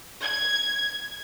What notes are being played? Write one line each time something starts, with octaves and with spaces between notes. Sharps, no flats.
G#6